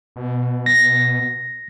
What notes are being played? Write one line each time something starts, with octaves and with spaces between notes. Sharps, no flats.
B2
A#6